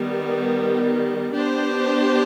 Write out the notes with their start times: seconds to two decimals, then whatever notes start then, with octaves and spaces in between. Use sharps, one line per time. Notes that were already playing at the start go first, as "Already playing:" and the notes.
Already playing: D#3 G3 B3
1.32 B3 D4 G4 C5